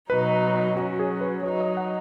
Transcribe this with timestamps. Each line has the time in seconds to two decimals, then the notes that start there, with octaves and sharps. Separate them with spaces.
0.10 B2 F#3 D#4 B4
0.77 F#3 C#4 F#4
0.99 G#4
1.21 B4
1.43 F#3 D#4 C#5
1.61 D#5
1.77 F#5